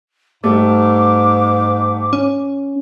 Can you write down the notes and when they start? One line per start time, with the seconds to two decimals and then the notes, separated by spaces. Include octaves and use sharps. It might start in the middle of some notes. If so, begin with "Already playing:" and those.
0.44 G#2 G3 A3 D6
2.13 C#4